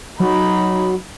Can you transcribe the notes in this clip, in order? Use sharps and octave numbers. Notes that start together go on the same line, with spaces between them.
F#3 D#4 B5